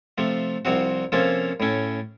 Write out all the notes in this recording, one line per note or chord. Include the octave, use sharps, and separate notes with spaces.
C3 F3 A3
C2 C3 F3 C4 F#4
C3 F3 A#3 C#4 A4
A2 A3 C#4